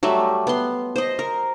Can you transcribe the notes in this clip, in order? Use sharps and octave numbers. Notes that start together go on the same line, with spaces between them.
F#3 G3 A3 E5
B3 C6
C5 D#5
A#4